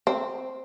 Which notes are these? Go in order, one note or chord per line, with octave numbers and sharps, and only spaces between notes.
C4